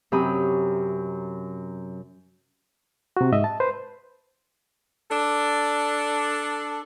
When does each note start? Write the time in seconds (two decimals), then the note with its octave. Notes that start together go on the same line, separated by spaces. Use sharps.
0.12 F#2 C3 C#4 G4 B5 D#6
3.17 C3 F#4
3.32 G#2 D#5 E5
3.44 A5
3.60 B4 C5
5.11 D4 A4